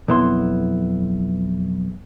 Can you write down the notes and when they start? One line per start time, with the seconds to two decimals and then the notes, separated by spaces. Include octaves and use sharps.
0.08 B1 F2 B3 E4 C6